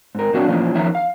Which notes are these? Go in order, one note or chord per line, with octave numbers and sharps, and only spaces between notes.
G#2 A#4
A#2 F#3 C4 D4 F#4 F5
A#2 E3 F3 A#3 C#4 F4
E2 D#3 F3 C#5 E5 A#5
F5